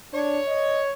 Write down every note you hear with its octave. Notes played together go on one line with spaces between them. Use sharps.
D4 C#5
D#5